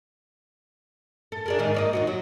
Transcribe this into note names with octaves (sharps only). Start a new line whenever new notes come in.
A4
D4 G#4 A#4
G#2 D#3 D#4
A#3 D5 D#5
D#2 C3 F#4
F#3